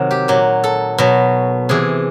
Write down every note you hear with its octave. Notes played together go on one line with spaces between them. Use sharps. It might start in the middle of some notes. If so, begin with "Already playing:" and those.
Already playing: C3 D#3 F#3
G4
A#2 F#3
A4
B2 F#3
C3 E3 G#4